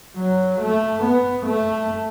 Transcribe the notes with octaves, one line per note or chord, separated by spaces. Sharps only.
F#3
A3
B3
A3